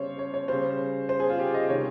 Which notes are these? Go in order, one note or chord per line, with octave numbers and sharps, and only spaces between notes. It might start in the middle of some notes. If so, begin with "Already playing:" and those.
Already playing: C#3 G3 C5 C#5
C#5
C#5
C#3 G3 C5
C5
G#4
F4
G4
D#5
C3 D#3 G3 C#5